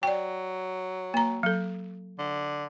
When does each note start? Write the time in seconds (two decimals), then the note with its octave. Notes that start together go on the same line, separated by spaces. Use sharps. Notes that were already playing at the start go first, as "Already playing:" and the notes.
0.03 F#3 D5 G5
1.14 A#3 A#5
1.43 F#3 A4
2.19 D3